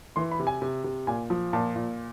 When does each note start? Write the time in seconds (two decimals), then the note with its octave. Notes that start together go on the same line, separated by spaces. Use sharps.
0.16 E3 C6
0.31 B5
0.40 C3
0.47 G#5
0.62 C3
0.84 C3
1.07 A#2 G#5
1.30 F3
1.53 A#2 A5
1.76 A#2